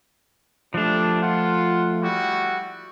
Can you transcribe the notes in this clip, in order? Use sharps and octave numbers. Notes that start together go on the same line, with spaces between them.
F3 G3 A3 D4
F4 F#5
G3 E4 F#4